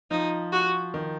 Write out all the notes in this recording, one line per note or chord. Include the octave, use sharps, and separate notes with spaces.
F3 D#4
F#4
D#3